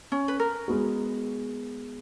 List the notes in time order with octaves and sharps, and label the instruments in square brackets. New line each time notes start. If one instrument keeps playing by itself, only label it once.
[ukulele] C#4
B4
A#4
[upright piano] G#3 B3 F#4